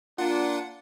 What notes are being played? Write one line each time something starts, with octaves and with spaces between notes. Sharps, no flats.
A#3 D4 F4 F#5